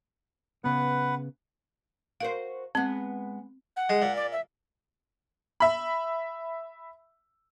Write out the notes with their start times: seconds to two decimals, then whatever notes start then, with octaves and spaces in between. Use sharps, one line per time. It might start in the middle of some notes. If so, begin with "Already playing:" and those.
0.64 C#3 B3 B4 F#5
2.20 F#4 A#4 C5 F5
2.75 G#3 B3 C4
3.77 F#5
3.89 G#3
4.02 A#2
4.16 D5
4.32 E5
5.60 E5 B5